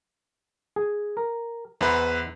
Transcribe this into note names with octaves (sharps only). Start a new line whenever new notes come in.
G#4
A#4
E2 E4 B4 C5 F#5